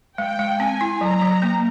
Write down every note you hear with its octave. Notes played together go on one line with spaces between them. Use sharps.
G#3 G5
G#3
C4 G#5
E4
F#3 A#5
F#3
A#3